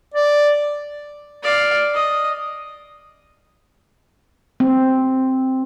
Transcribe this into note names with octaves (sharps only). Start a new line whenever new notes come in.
D5
D5 F5
D#5
C4